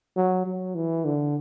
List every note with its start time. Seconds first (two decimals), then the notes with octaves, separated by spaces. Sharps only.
0.17 F#3
0.46 F#3
0.75 E3
1.05 D3